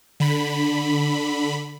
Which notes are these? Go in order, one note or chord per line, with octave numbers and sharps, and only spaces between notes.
D3 B5